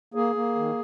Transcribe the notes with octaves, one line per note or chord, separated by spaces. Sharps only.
A#3 G#4
A#3
D#3